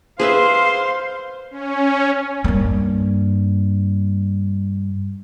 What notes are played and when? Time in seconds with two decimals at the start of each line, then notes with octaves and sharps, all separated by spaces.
0.19 G#4 B4 C5 E5 F5 C6
1.51 C#4
2.44 G2 A#3